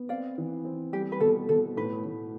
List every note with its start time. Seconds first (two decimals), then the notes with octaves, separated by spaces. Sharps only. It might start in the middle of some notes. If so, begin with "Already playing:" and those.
Already playing: B3
0.09 C4 D5 F5
0.38 E3
0.65 C4
0.92 G3 G4
1.12 B4
1.20 B2 A4
1.49 B2 A4
1.77 A2 B4
2.05 A2